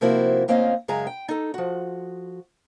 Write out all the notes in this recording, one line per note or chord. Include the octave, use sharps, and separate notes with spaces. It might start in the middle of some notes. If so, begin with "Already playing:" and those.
C3 F3 A#3 C4 E4 F#4
D2 A#3 C4 C#4 D#5 F5
F#2 C#3 G#3 G#4 A#5
G5
D#4 A4
F3 F#4